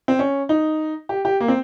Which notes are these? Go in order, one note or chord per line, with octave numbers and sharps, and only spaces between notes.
C4
C#4
D#4
G4
G4
A#3
C4